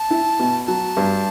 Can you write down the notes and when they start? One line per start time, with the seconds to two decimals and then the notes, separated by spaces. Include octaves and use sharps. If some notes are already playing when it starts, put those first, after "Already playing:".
Already playing: A5
0.10 E4
0.39 B2
0.67 F#3 A5
0.97 G2